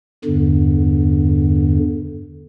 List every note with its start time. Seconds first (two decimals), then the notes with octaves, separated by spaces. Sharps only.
0.24 E2 G2 D3